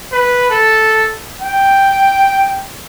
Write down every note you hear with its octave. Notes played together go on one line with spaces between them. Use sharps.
B4
A4
G5